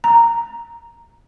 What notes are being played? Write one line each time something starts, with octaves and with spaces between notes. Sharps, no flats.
A#5